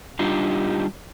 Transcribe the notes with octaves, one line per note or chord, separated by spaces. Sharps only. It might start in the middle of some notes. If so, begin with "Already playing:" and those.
G3 D4 D#4 F4 G4